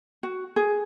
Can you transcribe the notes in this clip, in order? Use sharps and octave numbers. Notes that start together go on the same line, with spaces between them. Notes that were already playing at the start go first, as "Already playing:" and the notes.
F#4
G#4